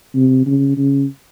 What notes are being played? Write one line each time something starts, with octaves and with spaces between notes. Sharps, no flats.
C3
C#3
C#3